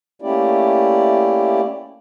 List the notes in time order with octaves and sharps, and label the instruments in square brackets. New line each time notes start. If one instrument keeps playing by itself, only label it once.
[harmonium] A3 A#3 C#4 E4 G4 D5